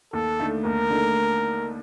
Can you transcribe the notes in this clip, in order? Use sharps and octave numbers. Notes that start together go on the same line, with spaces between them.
D#2 A4
D3 A3 D#4
D#2 A#4
D3 A3 D#4